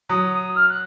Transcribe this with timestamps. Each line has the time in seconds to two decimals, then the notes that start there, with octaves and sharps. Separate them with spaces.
0.09 F#3 D#6
0.33 D#6
0.55 F6
0.69 F#6